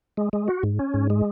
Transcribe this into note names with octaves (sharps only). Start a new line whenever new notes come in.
G#3
G#3
F#4
G#2
C#4
G#2
G#3